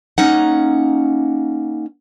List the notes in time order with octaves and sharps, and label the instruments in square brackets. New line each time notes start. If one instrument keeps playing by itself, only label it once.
[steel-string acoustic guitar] A#3 C#4 D#4 F#5